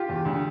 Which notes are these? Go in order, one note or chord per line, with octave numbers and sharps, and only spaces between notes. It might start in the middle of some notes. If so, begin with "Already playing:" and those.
Already playing: F4 G4
E2
D2